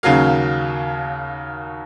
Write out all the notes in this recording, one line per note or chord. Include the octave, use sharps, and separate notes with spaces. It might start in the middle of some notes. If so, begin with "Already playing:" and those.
D#2 C#3 F#3 A#3 F5